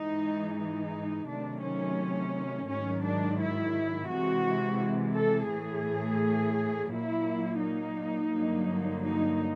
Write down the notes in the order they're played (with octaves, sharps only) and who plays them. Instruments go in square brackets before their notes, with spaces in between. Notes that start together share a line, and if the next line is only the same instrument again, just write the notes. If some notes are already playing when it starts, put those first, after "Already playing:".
Already playing: [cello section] G#2 E3 G#3 D#4
D#4
C3 D#3 F#3 A3 D4
C#4
G#2 D#3 F#3 C#4
D4
E4
C3 E3 G#3 F#4
A4
A2 E3 A3 G#4
A#2 F#3 A#3 E4
D#4
G2 D3 F#3 A#3
D#4